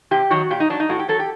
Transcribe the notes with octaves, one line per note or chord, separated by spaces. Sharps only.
C3 G4
D#3 F#3 F#4
A#2 G4
D#4
F#3 D4
D#4
A2 F#4
G4
F#3 A4
G4